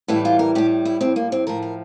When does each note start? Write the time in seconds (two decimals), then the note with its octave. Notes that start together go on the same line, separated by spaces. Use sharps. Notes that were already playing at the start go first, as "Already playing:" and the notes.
0.08 A2 E3 G3 E4
0.25 F4
0.39 A#4
0.55 A2 G3 G4
0.85 E4
1.01 A2 G3 C4
1.16 A#3
1.32 C4
1.47 A2 F3 A#4
1.62 A#4